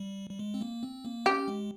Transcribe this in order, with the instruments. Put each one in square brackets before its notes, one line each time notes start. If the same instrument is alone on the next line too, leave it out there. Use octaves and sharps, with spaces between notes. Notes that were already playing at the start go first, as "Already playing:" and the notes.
Already playing: [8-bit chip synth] G3
G3
G#3
C4
A#3
C4
A#3
[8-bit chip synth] C#4 [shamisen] G4
[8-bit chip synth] G#3